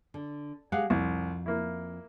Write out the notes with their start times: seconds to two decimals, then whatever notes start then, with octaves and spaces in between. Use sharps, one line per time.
0.14 D3
0.72 G#3 G4 F5 F#5
0.90 C2 F2
1.46 A#3 E4